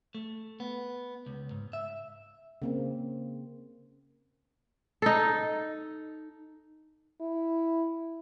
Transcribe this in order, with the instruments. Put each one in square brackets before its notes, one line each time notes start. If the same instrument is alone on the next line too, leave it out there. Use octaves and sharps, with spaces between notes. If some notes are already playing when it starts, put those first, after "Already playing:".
[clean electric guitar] A3
B3
C#2
G#2
E5
[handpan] C#3 A#3 C4
[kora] D#4 A4
[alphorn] E4